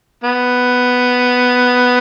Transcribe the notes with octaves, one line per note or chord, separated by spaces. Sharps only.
B3